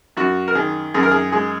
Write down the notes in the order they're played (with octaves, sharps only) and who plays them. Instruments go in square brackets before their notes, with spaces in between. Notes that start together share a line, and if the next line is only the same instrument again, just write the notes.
[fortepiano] F#2 F#4
A#4
D#3 G#4
F#2 G#4
A#4
G#4
G#3 G#4